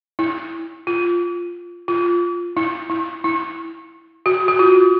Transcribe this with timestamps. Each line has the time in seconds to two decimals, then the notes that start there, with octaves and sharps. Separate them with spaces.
0.19 E4
0.87 F4
1.88 F4
2.57 E4
2.90 E4
3.24 E4
4.26 F#4
4.48 F#4
4.59 F4